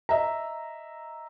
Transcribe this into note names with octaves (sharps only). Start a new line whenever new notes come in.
D#5 E5 A#5